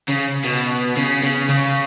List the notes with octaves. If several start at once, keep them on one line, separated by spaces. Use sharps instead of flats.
C#3
B2
C#3
C#3
C#3